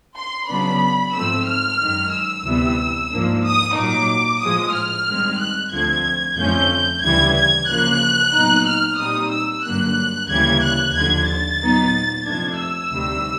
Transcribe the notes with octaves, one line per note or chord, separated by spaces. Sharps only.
C6
C#3 F#3 B3 D4 B5
G#2 F3 A3 C4 E6
F6
F#2 D#3 G#3
E6
D2 C3 E3 G3 B3
G#2 F3 A#3 D4
D#6
A#2 F#3 A#3 D#4 D6
A2 F3 G#3 D#6
F6
G2 D#3 G#3 C4
F#6
D2 D3 F3 A3 C4 G#6
F2 D3 F3 A3 C#4 G6
D2 C#3 E3 G3 G#6
G#6
C#3 F3 A#3 F#6
A#2 F#3 B3 D#4
F6
A#2 G3 C4 D#4 D#6
E6
G2 D3 F#3 A#3 F#6
D2 C#3 E3 G3 A#3 G#6
F#6
D#2 D3 F3 G#6
A6
A#2 F#3 B3 D#4
F2 C3 F3 A3 D4 G#6
E6
D2 C3 D#3 G3